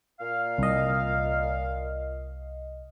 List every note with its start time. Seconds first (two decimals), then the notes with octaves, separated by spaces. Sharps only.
0.21 A#2 F5
0.58 C2 D#5